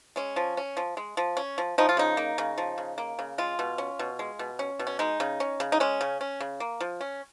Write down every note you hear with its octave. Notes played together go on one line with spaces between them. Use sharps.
G#3 C#4
F3
C#4
F3
G#3
F3
C#4
F3
F3 D#4
F4
C#3 D#4
A#3
C#3
F3
C#3
A#3
C#3
G#3 F4
B2
C#4
B2
G#3
B2
C#4
B2
C#4
G#3 D#4
C#3
C#4
C#3
D#4
G#3 C#4
C#3
C#4
C#3
A#3
F3
C#4